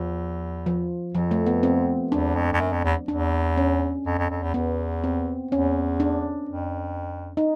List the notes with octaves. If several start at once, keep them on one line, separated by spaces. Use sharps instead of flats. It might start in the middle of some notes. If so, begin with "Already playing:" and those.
Already playing: E2 F3
F3
F2 F3
A3
B3
C4
E2 D4
F2
F2
F#2
F2
E2
E2 D4
C#4
F2
F2
F2
E2
E2 B3
C4
E2 C#4
D4
F2
D#4